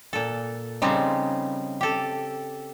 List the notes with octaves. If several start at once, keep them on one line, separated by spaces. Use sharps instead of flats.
A#2 A4
C#3 F3 G3 C4 D#4
G4 A4